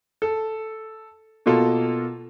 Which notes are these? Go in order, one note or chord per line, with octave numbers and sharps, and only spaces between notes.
A4
B2 A#3 F4 A4